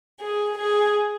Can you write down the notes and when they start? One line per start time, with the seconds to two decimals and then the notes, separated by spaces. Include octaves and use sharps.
0.21 G#4
0.57 G#4